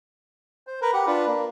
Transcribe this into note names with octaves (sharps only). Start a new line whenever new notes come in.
C5
A#4 B4
G4 F#5
D4 F4 B4
A#3